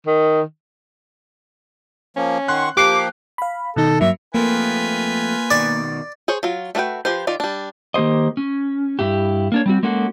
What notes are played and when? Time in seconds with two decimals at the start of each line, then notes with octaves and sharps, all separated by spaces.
0.07 D#3
2.17 F3 A#3 C#4
2.48 D#3 F#5 C6 C#6 F#6
2.77 F3 A#3 G4 D6 F#6 C7
3.38 F5 B5
3.76 B2 D#3 D#4 A4
4.01 G2 F#3 A#3 E5
4.35 F3 A3 A#3 C4 F4 B4 G#5
5.51 B2 D#3 D5
6.28 G#4 C5 C#5
6.43 F#3 F4
6.75 A3 D4 F#4 B4 G5
7.05 F3 G4 B4 C5
7.27 D#3 F4 D5
7.40 G3 D4
7.94 D#3 A#3 G4 C5 D#5
8.37 C#4
8.99 G2 E4 G4
9.52 A#3 D4 C#5
9.66 G3 C4 F#4
9.83 G#3 A#3 C#4 F#4 A4